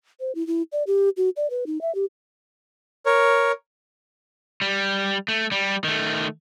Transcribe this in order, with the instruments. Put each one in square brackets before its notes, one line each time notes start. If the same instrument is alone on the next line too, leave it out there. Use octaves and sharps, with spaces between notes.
[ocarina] C5
E4
E4
D5
G4
F#4
D5
B4
D#4
E5
G4
[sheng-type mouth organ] A#4 C#5
[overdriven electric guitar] G3
A3
G3
D#3 A3